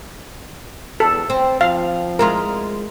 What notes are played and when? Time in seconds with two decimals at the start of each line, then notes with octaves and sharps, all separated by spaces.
1.00 E2 A4
1.30 C4 C5
1.61 F3 F5
2.19 G#3 E4 F4 A#4